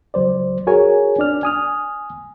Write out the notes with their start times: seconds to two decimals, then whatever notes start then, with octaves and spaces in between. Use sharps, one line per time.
0.14 C#2 F#3 C5 D5
0.67 F#4 G#4 A#4 C#5 G#5
1.18 D4 D5 F6
1.43 G#5 D#6 F6